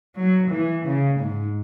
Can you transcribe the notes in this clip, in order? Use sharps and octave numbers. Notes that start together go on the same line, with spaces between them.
F#3
E3
C#3
G#2